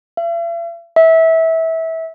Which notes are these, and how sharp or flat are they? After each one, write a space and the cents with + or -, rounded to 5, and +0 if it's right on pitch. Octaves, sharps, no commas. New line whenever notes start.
E5 +45
E5 -20